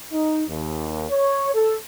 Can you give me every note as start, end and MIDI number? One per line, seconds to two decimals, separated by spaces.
0.12 0.44 63
0.48 1.06 39
1.10 1.54 73
1.55 1.75 69